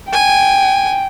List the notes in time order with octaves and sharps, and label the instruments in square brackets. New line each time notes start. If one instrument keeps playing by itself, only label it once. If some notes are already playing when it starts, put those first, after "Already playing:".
[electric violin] G5 [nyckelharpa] G#5